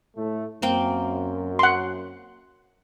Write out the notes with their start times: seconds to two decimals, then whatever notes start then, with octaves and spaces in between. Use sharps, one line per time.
0.16 A2 A3
0.62 F#2 A#3 C4 G5
1.59 F#5 C6